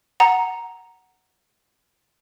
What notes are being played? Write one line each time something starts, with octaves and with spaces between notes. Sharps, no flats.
F#5 A#5